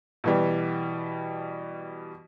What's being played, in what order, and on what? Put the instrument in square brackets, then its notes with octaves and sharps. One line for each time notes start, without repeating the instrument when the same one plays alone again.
[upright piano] B2 E3 G3